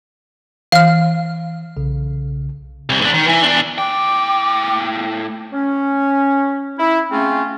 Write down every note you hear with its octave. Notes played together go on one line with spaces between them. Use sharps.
E3 F5 F6
B1 C#3
C2
G#2 D4
D#3
E3
E2 D4
A2 G5 D6
C#4
E4
G#3 A3 C4 C#4 F4